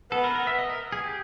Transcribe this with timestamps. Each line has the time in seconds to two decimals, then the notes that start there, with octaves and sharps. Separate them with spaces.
0.12 B3 A4
0.24 A#4
0.35 A#4
0.47 E5
0.59 D#5
0.70 A#4
0.92 G#4
1.04 G4